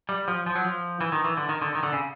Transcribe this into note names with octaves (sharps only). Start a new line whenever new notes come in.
G3
F3
F3
F#3
F3
E3
D#3
E3
D3
D#3
D3
D#3
D3
C#3